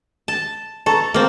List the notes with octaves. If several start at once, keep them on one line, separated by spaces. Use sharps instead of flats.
A5
A4 A5 A#5 C#6
A#3 C4